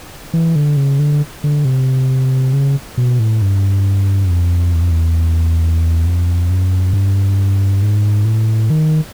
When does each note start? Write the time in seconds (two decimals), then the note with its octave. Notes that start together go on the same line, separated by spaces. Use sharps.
0.34 E3
0.56 D3
0.77 C#3
0.99 D3
1.44 D3
1.65 C3
2.53 C#3
2.98 B2
3.19 A2
3.42 G2
4.25 F#2
4.30 F2
4.74 E2
4.82 F2
4.91 E2
6.06 F2
6.50 F#2
6.93 G2
7.83 G#2
8.25 A2
8.70 D#3